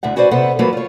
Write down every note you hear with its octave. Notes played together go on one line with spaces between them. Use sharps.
D2 A2 E5 F#5
C#4 F#4 B4 C5 D5
C3 B3 A4 C5 E5 F#5
E3 F#3 A3 A#3 F4 B4
F4 C#5